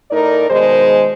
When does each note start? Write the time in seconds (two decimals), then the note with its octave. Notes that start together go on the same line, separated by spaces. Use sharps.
0.11 A2 D#4 A#4 D5
0.50 B2 D#3 G#3 G#4 C5